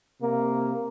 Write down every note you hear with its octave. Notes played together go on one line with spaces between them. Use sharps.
C3 A#3